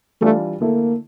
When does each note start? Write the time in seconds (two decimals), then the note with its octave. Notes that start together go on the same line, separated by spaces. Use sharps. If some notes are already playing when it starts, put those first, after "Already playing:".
0.21 E3 G3 A3 D4 F4
0.60 D3 A3 A#3 E4